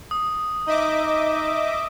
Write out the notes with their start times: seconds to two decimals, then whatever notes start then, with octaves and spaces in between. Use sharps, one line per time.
0.11 D#6
0.67 D#4 D#5 E5 D6